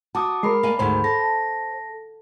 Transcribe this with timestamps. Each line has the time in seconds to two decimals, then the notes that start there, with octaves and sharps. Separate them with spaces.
0.15 F#4 A5 D6 D#6
0.43 G#3 A#4 B5 C7
0.63 A#3 D5 G#5
0.79 D2 G#2 D#3 C5 B5
1.04 A4 A#6